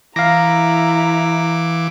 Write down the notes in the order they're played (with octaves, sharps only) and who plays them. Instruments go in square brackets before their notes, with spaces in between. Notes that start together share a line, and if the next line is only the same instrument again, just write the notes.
[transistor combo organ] E3 D6 [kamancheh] E4 A#5 [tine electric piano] F5 A#6